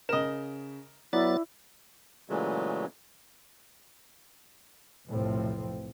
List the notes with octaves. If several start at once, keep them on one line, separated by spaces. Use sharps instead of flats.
C#3 A#4 D#5 E7
F#3 B3 E4 D5 A6
A#2 C#3 E3 F#3 G#3 A3
F1 B1 A2 F3 C4